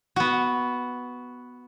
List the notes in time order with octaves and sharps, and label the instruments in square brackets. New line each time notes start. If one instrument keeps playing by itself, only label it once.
[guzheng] B3 F#4